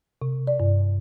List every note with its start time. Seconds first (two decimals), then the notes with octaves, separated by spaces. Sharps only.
0.22 C3
0.47 D5
0.60 G2